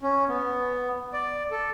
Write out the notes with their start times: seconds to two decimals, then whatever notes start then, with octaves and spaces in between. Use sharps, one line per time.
0.02 C#4
0.29 B3
1.13 D5
1.51 A4